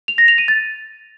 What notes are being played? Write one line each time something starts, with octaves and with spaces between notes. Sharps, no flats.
F7
A#6
F7
D#7
A6